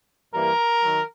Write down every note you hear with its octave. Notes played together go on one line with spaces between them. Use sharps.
G2 E3 G3 A#3 A#4
D#3 F#3